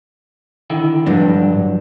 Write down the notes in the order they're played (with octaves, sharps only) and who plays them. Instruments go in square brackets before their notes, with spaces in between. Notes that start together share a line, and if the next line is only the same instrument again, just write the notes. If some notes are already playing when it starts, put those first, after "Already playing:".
[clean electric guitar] D3 D#3 E4
[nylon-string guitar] G2 D4 [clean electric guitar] D3 F3 F#3